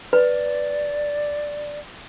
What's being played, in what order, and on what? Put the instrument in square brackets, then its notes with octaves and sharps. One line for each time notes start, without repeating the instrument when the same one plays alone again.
[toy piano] B4 [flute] D5